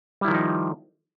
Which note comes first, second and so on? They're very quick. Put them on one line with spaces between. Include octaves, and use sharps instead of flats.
G3 E4 D#3 F3 D#4